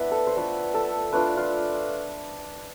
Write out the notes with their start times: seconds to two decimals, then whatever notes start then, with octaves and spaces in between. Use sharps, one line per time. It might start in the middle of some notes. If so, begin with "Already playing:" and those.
Already playing: B3 D4 E4 B4 E5
0.12 A4
0.27 C5
0.37 A3 D4 F4 B4
0.74 A4
1.13 A3 D4 F4 B4
1.37 F4